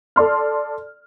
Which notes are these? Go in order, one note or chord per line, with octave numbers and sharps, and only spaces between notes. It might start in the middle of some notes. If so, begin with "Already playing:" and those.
A4 D5 C6 F6